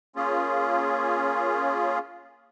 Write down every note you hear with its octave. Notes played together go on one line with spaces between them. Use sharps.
A#3 C#4 F4 G#4